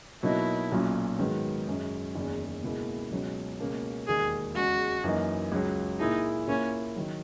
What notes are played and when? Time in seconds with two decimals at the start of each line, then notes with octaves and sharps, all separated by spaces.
0.23 B2 F#3 A#3 D#4 E4
0.72 B1 A#2 F#3 C#4
1.19 G#2 D#3 F#3 B3
1.67 F#2 C#3 G#3 C#4
2.15 F#1 E2 D#3 G#3 C#4
2.63 C#2 B2 A#3 E4 G#4
3.11 C#2 B2 F#3 C#4
3.60 C#2 B2 A#3 C#4
4.07 E1 D#2 D#3 A#3 G#4
4.56 E2 C#3 G#3 F#4
5.04 F#2 E3 A#3 D#4
5.52 C#2 C#3 F#3
5.99 A#2 A#3 D#4 E4 G#4
6.47 A#2 A#3 C#4 E4
6.96 D#3 F#3